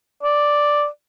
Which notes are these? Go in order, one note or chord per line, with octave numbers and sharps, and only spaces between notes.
D5